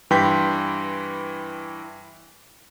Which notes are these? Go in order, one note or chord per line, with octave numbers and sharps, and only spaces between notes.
G2 E3 G5 C6 G6 B6